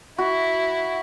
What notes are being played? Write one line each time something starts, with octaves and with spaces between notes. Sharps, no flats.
E4 F#4